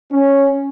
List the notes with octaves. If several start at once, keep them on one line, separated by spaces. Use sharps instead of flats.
C#4